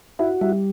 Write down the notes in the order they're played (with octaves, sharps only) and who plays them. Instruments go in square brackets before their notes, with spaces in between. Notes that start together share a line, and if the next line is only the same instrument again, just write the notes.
[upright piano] E4 E5 [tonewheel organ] F#4
[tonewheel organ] G3 [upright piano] E4 E5